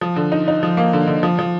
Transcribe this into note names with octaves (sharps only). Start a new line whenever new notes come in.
F3
D3
D#4
D#4
F3
A#3
D3
D3
F3
F3